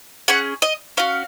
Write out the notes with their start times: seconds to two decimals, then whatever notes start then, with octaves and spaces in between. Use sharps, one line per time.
0.28 C#4 G#4 F#5
0.62 D#5
0.97 C#4 F#4 F5